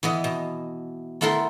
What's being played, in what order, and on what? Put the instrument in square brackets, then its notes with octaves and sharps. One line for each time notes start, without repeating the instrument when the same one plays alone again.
[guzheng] E3 B3 D#5
B2
A3 B3 E4 A4 A#4 C6